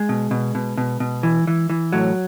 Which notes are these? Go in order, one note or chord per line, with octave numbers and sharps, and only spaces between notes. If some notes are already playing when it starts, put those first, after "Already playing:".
Already playing: G#3
B2
B2
B2
B2
B2
E3
E3
E3
A2 F#3